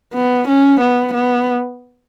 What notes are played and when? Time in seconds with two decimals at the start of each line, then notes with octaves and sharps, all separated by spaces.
0.14 B3
0.48 C#4
0.80 B3
1.14 B3